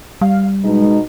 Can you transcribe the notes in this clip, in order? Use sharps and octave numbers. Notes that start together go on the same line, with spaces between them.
G3 F5
B2 G#3 D#4